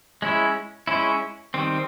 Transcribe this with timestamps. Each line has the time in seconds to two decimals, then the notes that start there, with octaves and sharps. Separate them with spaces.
0.22 G#3 C#4 E4
0.87 G#3 C#4 E4
1.54 D#3 G3 C4